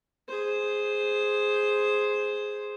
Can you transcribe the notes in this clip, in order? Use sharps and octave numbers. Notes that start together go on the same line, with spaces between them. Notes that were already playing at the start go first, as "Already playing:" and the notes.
G#4 C5